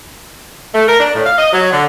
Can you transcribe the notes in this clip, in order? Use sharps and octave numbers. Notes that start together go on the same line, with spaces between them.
A3
A#4
D4
A2
F5
D#5
F#3
D3